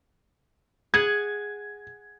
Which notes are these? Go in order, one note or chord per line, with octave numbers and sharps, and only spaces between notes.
G#4 F#5 G#6